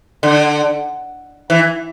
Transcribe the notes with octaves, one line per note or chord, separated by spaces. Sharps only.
D3
E3